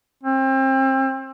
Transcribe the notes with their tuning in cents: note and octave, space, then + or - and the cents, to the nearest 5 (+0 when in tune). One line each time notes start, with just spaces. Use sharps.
C4 +30